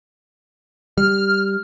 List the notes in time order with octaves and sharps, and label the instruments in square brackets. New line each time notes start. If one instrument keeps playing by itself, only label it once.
[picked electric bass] G3 [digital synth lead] F6